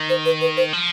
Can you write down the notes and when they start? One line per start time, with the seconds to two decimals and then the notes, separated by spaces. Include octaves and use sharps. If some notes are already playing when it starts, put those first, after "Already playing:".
Already playing: D#3
0.09 C5
0.25 B4
0.41 B4
0.57 C5
0.73 F3